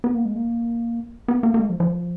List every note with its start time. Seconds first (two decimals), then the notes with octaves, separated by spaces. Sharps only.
0.04 B3
0.15 A#3
0.25 G#3
0.36 A#3
1.28 B3
1.43 A#3
1.54 A#3
1.59 G#3
1.70 F3
1.80 F3